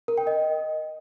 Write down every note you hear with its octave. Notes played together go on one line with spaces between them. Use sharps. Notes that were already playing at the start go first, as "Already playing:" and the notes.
A#4
G5
D#5